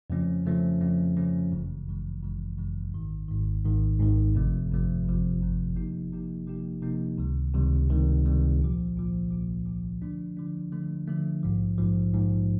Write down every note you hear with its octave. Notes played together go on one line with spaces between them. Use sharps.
F2 C#3 F3 A3 C#4
F2 C#3 F3 A3 C#4
F2 C#3 F3 A3 C#4
F2 C#3 F3 A3 C#4
G1 F#2 C#3 E3 G#3
G1 F#2 C#3 E3 G#3
G1 F#2 C#3 E3 G#3
G1 F#2 C#3 E3 G#3
G#1 G#2 D#3
G#1 G#2 D#3
G#1 G#2 D#3
G#1 G#2 D#3
G1 F2 C3 F3 A3
G1 F2 C3 F3 A3
G1 F2 C3 F3 A3
G1 F2 C3 F3 A3
C3 F3 A#3 D#4 G4
C3 F3 A#3 D#4 G4
C3 F3 A#3 D#4 G4
C3 F3 A#3 D#4 G4
C#2 C3 D#3 G3
C#2 C3 D#3 G3
C#2 C3 D#3 G3
C#2 C3 D#3 G3
A#1 A#2 F3
A#1 A#2 F3
A#1 A#2 F3
A#1 A#2 F3
D3 F3 A3 D4
D3 F3 A3 D4
D3 F3 A3 D4
D3 F3 A3 D4
A#1 G#2 F3
A#1 G#2 F3
A#1 G#2 F3